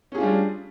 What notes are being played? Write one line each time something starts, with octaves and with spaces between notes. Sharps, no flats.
G3 C#4 D4 F4 G#4